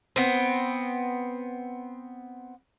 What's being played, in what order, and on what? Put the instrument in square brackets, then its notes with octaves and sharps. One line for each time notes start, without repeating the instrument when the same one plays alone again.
[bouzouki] B3 C4